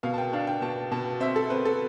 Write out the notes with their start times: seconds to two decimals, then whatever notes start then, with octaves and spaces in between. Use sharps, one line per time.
0.03 B2 F5
0.14 A5
0.18 G5
0.33 D4 F5
0.47 G5
0.62 B2 A5
0.91 B2 A5
1.20 C4 E5
1.36 A4
1.50 C4 B4
1.65 A4